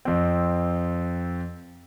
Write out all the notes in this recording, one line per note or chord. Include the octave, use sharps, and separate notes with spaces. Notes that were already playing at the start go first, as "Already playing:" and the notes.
F2 C4